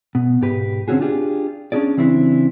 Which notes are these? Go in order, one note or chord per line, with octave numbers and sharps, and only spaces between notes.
B2
B1 G#2 G4 B4
D3 C4 C#4 F#4 G#4
D4 F4 G4 G#4
C#4 D4 E4 G#4 D5
C#3 E3 C4 D4 E4